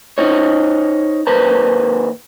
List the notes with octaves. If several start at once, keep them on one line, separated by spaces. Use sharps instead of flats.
D#4 C5 C#5
D#2 B4 C5 A#5